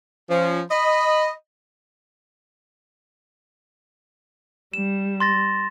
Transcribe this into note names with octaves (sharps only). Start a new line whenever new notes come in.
F3 C#4
D#5 B5
G3 E7
C6 A6 A#6